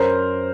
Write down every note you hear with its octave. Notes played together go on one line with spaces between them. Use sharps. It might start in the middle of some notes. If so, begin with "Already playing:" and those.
Already playing: F#2 A#4 C5